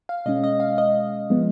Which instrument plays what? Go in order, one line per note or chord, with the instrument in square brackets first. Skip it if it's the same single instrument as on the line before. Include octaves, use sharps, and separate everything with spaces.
[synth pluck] F5
B2 G#3 C#4 D#5
D#5
F5
D#5
F3 G#3 B3